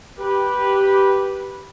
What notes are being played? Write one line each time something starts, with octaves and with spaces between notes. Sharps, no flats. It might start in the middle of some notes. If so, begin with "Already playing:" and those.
G4 B4